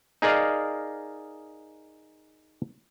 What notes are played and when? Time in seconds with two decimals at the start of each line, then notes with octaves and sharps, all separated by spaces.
0.22 D#4 G#4 A#4 D5 D#5 F5